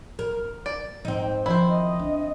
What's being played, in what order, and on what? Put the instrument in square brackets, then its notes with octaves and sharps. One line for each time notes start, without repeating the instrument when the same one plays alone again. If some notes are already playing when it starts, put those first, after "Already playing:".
[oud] A#4
[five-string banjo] D5
[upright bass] G#1 [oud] C4 D#4
[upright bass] D#3 F3 [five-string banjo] E4 C5
[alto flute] D#5
[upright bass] D4